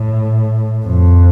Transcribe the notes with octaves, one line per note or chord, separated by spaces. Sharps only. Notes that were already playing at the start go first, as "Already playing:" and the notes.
Already playing: A2
F2